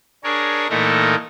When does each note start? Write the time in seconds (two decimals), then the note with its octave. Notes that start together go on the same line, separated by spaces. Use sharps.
0.24 D4 G#4 A#4 C#5
0.70 A#2 E3 A3 D#4 A4 A#4